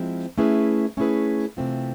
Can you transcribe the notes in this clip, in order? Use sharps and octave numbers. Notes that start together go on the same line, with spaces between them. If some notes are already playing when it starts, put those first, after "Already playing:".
Already playing: F3 G#3 C4 E4
A3 C#4 E4 G#4 B4
A3 C#4 E4 G#4 B4
C3 E3 A3 C4 F4